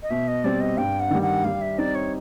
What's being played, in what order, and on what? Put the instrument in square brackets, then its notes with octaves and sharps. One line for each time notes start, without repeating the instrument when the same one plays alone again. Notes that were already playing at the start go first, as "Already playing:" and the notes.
[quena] D#5
[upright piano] B2 [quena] E5
[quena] D#5
[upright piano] G3 C4 [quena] D5
[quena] D#5
[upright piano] G2 [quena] G5
[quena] F#5
[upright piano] D#3 G3
[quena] F#5
[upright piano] G3 [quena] F5
[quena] E5
[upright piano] C4 D#4 [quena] D5
[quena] C#5